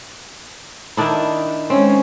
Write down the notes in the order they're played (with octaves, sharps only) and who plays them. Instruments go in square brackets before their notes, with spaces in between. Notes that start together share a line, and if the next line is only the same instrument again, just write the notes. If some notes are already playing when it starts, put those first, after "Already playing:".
[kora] D#3 D4 E4
[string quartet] G#3 C#4 [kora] C4